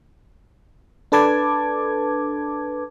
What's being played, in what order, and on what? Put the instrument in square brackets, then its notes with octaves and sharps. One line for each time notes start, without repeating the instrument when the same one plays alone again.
[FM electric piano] D4 A4 B4 A5 D6 G#6